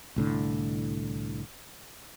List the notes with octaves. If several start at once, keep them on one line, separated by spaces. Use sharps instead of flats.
C2 A2 D3